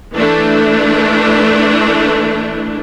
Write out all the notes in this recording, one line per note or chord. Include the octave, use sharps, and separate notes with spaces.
E3 A3 D4